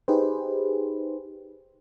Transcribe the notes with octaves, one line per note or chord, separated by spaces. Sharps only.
D#4 G4 G#4 B4 C5